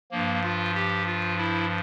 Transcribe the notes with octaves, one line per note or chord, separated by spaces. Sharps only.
G2 F3 A#3
F4
G4
F4
E4